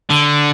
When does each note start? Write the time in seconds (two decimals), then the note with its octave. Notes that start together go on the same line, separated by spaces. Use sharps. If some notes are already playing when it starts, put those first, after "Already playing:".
0.10 D3